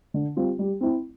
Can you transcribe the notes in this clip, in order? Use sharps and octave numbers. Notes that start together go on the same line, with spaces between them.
D3
G3 C4 F4
G3
C4 E4